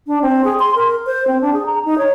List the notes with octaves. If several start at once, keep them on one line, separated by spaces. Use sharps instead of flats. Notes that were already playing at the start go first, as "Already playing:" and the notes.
D4
C4
G#4
C6
A#4
C5
C4
D4
G#4
A#5
D#4
C#5